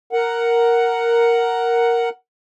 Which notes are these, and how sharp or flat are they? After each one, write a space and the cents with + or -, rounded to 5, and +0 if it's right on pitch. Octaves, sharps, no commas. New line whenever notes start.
A#4 +0 F#5 +5